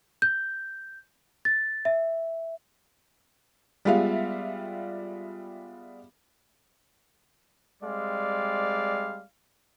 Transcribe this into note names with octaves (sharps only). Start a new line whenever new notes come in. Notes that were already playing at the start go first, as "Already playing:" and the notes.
G6
A6
E5
G3 G#3 B3 F4 E5 F5
G3 G#3 C4 D5 F5